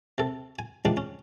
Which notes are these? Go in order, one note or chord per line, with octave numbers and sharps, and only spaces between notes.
C3 A4
G#5
E3 F3 G3 G#3 D4 D#4
C#4